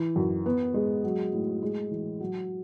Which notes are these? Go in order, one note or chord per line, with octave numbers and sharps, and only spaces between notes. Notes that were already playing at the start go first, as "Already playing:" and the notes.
Already playing: E3
F#2
B3
G#3
F#3
A2
G#3
E3
F#3